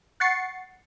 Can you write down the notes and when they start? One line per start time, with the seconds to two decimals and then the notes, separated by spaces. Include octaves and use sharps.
0.20 F#5 C#6 A6 C7 C#7